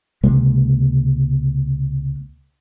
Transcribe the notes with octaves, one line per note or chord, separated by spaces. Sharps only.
C#2 C3 G#3 A#3